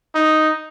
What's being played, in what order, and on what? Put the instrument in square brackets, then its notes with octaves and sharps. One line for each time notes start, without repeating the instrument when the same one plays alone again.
[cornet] D#4